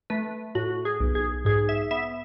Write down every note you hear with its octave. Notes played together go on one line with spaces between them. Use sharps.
A3 B4
A2 F#4
G#4
B1
G#4
G#2 G#4
E5
B3 E5